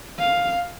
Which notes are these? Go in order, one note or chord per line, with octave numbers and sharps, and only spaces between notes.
F5